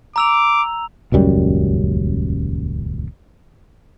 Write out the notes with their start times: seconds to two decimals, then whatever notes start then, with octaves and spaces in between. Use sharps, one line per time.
0.16 A#5 D6 E6 F7
1.12 D#1 C#2 F#2 G3